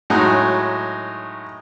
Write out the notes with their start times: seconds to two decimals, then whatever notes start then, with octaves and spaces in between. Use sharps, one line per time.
0.10 A2 F#3 G#3 D#4